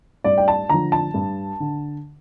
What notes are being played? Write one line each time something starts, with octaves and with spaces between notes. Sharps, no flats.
G2 D5
G5
A5
D3 F3 A#5
A5
G2
D3